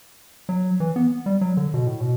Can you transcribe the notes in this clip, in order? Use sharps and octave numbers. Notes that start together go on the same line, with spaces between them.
F#3
E3
B3
G3
F#3
D3
B2
A2
B2